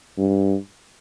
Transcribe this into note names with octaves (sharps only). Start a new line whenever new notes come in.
G2